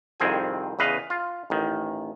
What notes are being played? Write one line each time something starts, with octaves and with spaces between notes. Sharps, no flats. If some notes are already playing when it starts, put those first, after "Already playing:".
C2 F2 D#3 C4 G#4 G#5
E2 C#3 B4 D#5 F5
F4
A1 D#3